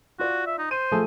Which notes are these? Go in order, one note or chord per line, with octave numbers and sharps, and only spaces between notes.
F4 F#4 D5
E5
D#4
C5 D#7
F3 A3 G#4